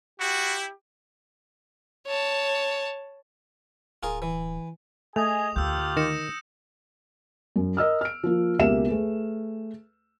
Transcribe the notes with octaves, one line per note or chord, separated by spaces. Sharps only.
E4 F#4 G4
C#5 A5
D1 F4 G#4 A#4
E3
A3 G#4 D#5 G#5 D#6 F7
D2 A#3 F4 G4 E6 G6
D#3 A#6 C#7 E7
F#2
A#4 D#5 E6 F6
F6 D7
F3 A#3 F4
C#2 B2 A#3 G4 E5 E7
A3 G#4 B4